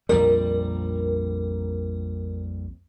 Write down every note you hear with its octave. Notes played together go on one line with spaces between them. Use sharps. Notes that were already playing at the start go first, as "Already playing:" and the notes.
A#1 F2 G3 A#4